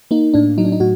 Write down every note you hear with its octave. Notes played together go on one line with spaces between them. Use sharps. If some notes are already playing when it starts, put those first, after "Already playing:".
A#3 D#4
A2 D4
F#3 D#4
D4
D#4
A2 F#4